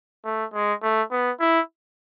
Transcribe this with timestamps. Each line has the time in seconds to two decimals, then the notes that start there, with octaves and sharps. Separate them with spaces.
0.25 A3
0.54 G#3
0.82 A3
1.11 B3
1.40 E4